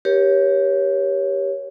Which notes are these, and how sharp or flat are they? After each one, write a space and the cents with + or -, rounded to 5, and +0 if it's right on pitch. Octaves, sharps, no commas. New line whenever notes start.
G4 +0 A#4 +45 C#5 +0